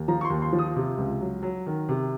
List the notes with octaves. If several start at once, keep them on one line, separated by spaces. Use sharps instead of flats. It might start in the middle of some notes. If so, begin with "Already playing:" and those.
Already playing: D#2
F3 A#5
C#6
C6
D#2
C6
F3
D#6
C3
C#2
F#3
F#3
D#3
C3